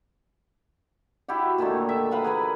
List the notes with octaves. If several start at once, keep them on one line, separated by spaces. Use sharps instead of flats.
E4 F#4 G4 F#5
A#2 D3 D#3 A3
E5
B4 F5 F#5 A#5
G#4 A#4 B4